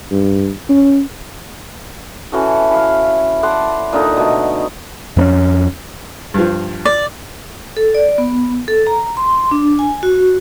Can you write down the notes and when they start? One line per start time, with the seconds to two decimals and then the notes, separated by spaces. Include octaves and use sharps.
0.11 G2
0.69 C#4
2.32 E3 C#4 F#4 A4
2.71 E4 F5
3.43 D5 F#5 A5 C6
3.93 A#2 D3 D#4
4.17 B2 A3
5.17 F2 B3 C#4
6.34 G2 F3
6.85 D5
7.77 A4
7.95 D5
8.18 B3
8.68 A4
8.87 A#5
9.17 C6
9.51 D4
9.79 G#5
10.03 F#4